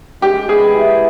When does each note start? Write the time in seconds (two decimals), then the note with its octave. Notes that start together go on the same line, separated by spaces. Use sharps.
0.21 G#3 G4
0.48 B3 G#4
0.74 E3